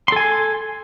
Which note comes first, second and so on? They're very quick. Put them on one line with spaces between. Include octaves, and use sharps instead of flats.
C6 A4 G#5